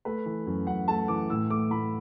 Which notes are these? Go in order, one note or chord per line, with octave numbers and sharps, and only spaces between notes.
A3 B4
E3
F#2
F#2 F#5
A3 A5
E3 D6
A2 E6
A3 D6
A2 B5